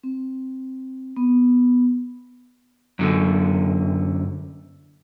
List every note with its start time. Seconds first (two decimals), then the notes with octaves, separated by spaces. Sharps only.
0.03 C4
1.16 B3
2.99 F#2 D3